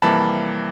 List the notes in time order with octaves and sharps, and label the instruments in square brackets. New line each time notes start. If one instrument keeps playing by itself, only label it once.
[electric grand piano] F2 C3 E3 G3 A#3 A5 B5